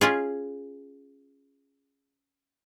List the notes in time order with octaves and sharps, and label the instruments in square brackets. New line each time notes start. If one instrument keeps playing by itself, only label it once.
[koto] C#4 F4 G#4